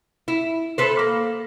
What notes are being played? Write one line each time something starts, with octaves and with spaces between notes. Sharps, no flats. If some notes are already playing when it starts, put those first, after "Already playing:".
E4
A4 B4 C5
A#3